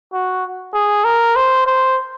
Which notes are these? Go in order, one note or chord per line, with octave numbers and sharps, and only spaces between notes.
F#4
G#4
A#4
C5
C5